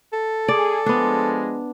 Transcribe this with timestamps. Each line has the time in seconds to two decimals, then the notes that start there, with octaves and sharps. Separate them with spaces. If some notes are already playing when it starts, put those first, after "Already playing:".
0.13 A4
0.48 G#4 D5
0.86 F3 G#3 B3 D4